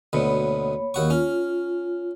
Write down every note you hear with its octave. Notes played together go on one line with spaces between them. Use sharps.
D2 B2 A#3 C#5 B5
D#2 F#4 C#6
C#4 F4